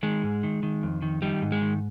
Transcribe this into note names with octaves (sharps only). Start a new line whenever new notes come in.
D#3 G#3
G#2
D#3
D#3
F2
D#3
D#3 G3
G#2
G#3
D#3